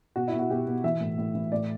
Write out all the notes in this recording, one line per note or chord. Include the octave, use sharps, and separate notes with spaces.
B2 F#4
E4
B2
F#4
B2 G4
B2
E3 E5
A2
A2
E3
A2 D5